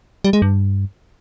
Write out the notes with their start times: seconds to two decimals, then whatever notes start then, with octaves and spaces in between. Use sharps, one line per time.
0.24 G3
0.33 G#3
0.42 G2